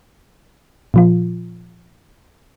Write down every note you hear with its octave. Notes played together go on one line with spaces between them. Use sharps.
A#2 F3 F4